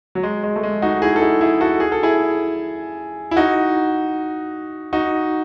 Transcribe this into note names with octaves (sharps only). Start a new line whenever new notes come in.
F#3
G#3
G#3
A3
G#3
D#4 F#4
E4 G#4
A4
E4 G#4
E4 G#4
F#4 A4
G#4
A4
E4 G#4
E4
D#4 F#4
D#4 F#4